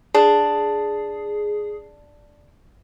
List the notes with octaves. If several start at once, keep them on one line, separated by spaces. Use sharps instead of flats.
D4 G#4